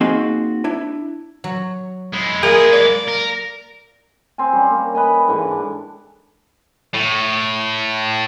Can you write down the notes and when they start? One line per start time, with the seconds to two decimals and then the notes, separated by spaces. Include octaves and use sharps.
0.01 A#3 C4 D#4 F#4 G#4 C6
0.64 D4 E4
1.44 F#3
2.14 G#3 E4
2.43 A#3 G#4
2.73 D5
3.08 A#4
4.38 C4 G#5
4.53 G3 C#4
4.70 A#3
4.95 B4 D#5 G#5
5.28 G#2 D3 E3
5.51 D4
6.94 A2